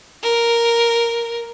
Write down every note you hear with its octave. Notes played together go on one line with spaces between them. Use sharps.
A#4